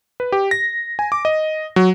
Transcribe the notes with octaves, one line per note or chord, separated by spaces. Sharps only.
B4
G4
A#6
G#5
D6
D#5
F#3